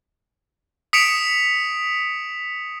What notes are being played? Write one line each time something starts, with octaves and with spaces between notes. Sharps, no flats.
D#6 B6 C#7 D7 E7 F7